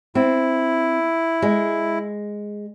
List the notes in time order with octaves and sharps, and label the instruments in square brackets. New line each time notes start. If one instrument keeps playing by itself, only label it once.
[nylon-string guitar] C4 [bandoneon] E4
[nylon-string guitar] G#3